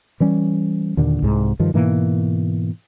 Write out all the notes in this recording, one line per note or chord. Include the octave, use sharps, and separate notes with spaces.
E3 G3 C#4
D#2 A#2 D3
C2 G#2
G2 D#3 F3
G#2 B2 E3 A#3